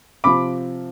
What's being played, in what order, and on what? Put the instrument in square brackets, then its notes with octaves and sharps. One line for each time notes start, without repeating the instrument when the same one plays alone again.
[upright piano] C3 F3 B5 D6